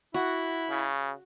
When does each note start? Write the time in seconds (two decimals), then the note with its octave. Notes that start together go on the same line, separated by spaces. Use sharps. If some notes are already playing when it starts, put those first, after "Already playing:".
0.14 E4 F#4
0.70 C#3